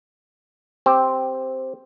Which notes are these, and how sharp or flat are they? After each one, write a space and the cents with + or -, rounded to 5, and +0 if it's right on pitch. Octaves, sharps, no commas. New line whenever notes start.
C4 +0 G4 +0